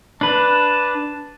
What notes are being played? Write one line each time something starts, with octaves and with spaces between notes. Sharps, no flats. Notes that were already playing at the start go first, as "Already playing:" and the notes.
D4 B4 A5